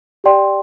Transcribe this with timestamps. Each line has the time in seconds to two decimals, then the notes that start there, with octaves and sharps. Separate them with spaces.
0.24 G4 D5 G5 C6